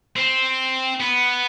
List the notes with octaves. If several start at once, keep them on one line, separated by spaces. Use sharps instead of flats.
C4
B3